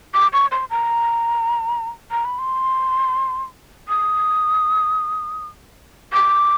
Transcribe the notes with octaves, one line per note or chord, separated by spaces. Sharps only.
D6
C#6
C6
A#5
A#5
B5
C6
D#6
D6